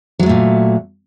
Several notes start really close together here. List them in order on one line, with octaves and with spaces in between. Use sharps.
F#3 G#3 A3 A#2